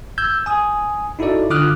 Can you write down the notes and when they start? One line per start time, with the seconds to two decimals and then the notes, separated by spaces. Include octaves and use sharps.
0.18 E6 G6 G#6
0.46 G#5 D#6
1.19 D#4 E4 F#4 A4 D5
1.50 D3 F4 D6 D#6 F6 F#6